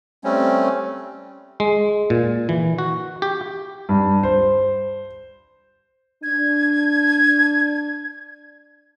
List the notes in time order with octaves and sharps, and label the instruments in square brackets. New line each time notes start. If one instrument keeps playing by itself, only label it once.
[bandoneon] G3 A3 C4 C#4
[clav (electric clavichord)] G#3
A#2
E3
F#4
G4
[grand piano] G2
C5
[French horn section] D4 [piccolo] G#6